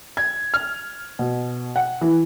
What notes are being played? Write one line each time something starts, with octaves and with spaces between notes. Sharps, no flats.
G#6
F6
B2
F#5
E3